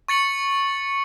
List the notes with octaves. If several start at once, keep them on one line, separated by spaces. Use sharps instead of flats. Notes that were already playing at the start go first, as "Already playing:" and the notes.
C#6 A6 C#7 F#7